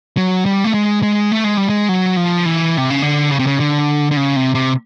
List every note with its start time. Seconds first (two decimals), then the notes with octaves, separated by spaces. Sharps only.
0.17 F#3
0.46 G3
0.64 A3
0.74 G#3
1.03 G#3
1.32 A3
1.44 G#3
1.57 G3
1.69 G#3
1.89 F#3
2.17 F3
2.45 E3
2.77 C3
2.90 C#3
3.02 D3
3.31 C#3
3.39 C3
3.47 C#3
3.60 D3
4.11 D3
4.17 C#3
4.36 C3
4.55 C3